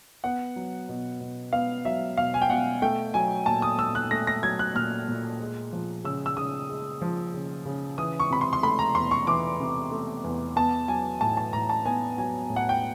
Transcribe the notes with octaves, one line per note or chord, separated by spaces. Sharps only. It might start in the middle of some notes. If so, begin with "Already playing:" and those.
B3 F#5
F#3
B2
B2
B3 F5
F#3 E5
B2 F5
G#5
G5
B2 F#5
A3 G5
F#3 G#5
A#2 A5
D#6
A#2 E6
F#6
A3 A#6
A#6
F#3 G#6
F#6
A#2 F6
A#2
G#3
F3
C#3 E6
E6
C#3 D#6
G#3
F3
C#3
C#3
E3 D#6
C#6
C3 B5
C6
C6
A3 B5
A#5
E2 C6
C#6
E3 D6
C3
A3
E2
B3 A5
F#3 G#5
A2 A5
A5
A2 A#5
A5
B3 G#5
F#3 G#5
A2
F#5
G5